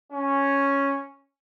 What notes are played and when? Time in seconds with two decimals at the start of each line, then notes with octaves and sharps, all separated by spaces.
0.12 C#4